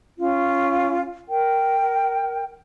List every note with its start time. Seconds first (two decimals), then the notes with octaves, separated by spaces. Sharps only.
0.18 C#4 F4
1.28 A#4 G5